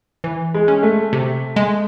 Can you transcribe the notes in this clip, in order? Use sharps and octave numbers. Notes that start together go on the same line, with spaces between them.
E3
G#3
C#4
A3
C3
G#3